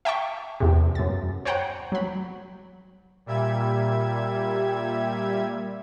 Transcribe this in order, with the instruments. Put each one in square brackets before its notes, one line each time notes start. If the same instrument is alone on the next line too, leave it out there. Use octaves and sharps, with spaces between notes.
[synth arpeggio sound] E5 G5 A5 C#6
E2 C3
F#2 A6
C5 C#5 F#5 G5 A#5
F#3 B5
[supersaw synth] A#2 G3 E5 G#6